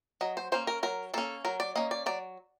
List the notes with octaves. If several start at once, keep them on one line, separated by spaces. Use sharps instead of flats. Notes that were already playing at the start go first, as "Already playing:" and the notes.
F#3 D#5
C5
A#3 C#4 C5
A#4
F#3 A#4
A#3 C#4 A4
F#3 A#4
D5
A#3 C#4 D#5
D5
F#3 D5